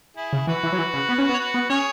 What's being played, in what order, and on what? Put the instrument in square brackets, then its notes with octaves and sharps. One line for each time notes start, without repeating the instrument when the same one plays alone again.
[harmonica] E4 G#4
[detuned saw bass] C#3
[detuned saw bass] E3 [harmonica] F#4 B4
[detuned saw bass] E3
F#3
E3
C#3
B3
C#4
B3
[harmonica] C#5
F#4 B4
[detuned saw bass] B3
[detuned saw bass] C#4 [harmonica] G#4 C#5